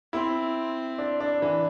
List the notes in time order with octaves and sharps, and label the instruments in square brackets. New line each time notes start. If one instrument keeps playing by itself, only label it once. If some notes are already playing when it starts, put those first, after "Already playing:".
[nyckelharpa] C4 [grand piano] E4
[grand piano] D4
D4
E3